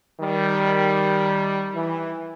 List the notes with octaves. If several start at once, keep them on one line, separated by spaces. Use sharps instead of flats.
D#3 G3
E3